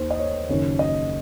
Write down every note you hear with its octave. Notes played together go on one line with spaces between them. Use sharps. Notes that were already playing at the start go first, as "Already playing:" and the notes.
Already playing: D#2 D#3 C5
D#5
C#5
F#1 F#2 D#3 C#5
D#5